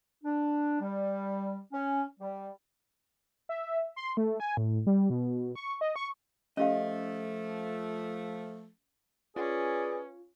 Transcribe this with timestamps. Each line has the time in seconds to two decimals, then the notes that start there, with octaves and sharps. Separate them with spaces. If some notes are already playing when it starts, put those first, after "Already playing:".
0.24 D4
0.81 G3
1.72 C#4
2.20 G3
3.49 E5
3.96 C6
4.17 A3
4.40 G#5
4.57 A2
4.87 G3
5.10 B2
5.56 C#6
5.81 D#5
5.96 C#6
6.57 F3 A3 C#4 G4 D#5 F5
9.36 C#4 F4 G#4 B4 D5